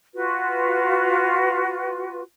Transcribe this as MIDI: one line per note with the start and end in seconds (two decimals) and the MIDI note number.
0.15 2.21 65
0.15 2.21 66
0.15 2.21 71